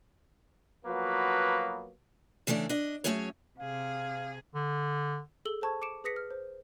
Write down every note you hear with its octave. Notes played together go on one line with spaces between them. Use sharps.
F3 F#3 A#3 B3 F#4 B4
C#3 E3 A3 D4 D5
D4 D#5
F#3 G#3 A3 C#4 G#4 C#5
C3 G#4 F5
D3
G#4 A4 E6 F#7 G7
A4 C5 A5 C#6 G#6
D6 C#7 D7 E7
G#4 B4 D#6 A#6 B6 C#7
F6
C5